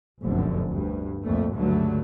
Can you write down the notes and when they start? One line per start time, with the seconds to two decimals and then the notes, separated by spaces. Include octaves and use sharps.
0.22 F1 A#1 F#2 B2 D3
0.67 D2 G2
1.24 C2 F2 A#2 A3
1.53 C#2 G2 D3 F#3 A3